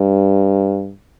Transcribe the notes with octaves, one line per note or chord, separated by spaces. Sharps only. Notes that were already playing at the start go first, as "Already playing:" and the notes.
Already playing: G2